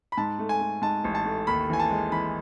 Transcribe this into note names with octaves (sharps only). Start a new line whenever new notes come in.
B5
G#2 A5
A3
G#5
A3
G#2 A5
A1
A5
A3
D#2 B5
E3 G#5
A5
G#3
E3 B5